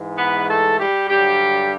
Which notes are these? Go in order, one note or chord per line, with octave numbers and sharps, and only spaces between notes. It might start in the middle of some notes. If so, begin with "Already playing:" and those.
Already playing: G#2 E3 G#3
B3 B4
A3 A4
G3 G4
G2 D3 F#3 G3 G4